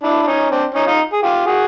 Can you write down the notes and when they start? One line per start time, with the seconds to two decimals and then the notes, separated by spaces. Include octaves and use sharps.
0.03 D4 E4
0.23 D4
0.27 C#4 D#4
0.51 C4 D4
0.74 C#4 D#4
0.87 D#4 F4
1.13 G#4
1.23 F4 G4
1.46 F#4 G#4